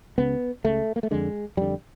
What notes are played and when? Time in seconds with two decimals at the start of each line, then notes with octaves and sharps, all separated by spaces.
0.18 C#2 C#3 B3
0.64 C#2 C#3 A3
0.96 A#3
1.03 A3
1.11 F2 D3 G#3
1.57 F2 D3 G3